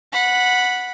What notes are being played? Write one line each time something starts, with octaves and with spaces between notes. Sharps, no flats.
F#5 B5